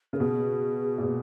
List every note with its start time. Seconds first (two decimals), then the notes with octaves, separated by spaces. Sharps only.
0.13 C#3 A#4
0.20 B2 G#4
0.98 A#2
1.03 B2